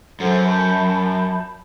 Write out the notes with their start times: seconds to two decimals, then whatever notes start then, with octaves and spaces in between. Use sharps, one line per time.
0.20 F#2 A4 C5 F#5
0.44 A5 B5 G6